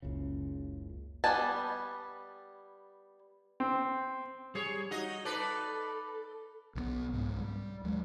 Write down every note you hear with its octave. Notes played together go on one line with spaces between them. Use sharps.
F#1 C#2 C#3
G3 B3 G#5 A5
C4
G3 G#4 C#5
D#4 F#4 D#5
D#4 A4 B4 D5
B1 E3 B3
C2 G#2
G3
D#2 F#3 G#3